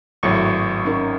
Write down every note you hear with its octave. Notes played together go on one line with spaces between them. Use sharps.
G#1 A2 F#3 C#6
C#4 D#4 A#4